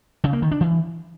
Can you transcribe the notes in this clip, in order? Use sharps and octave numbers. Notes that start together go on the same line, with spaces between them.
C#3
A#3
D#3
D4
E3